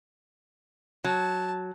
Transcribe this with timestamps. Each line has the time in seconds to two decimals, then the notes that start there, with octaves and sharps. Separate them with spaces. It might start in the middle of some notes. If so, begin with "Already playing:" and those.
1.04 F#3 A5